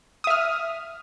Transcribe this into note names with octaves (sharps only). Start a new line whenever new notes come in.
E5 D#6 F6